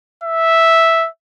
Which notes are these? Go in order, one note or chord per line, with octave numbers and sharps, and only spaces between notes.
E5